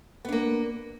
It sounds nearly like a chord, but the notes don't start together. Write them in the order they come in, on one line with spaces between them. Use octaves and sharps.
B3 D4 A#3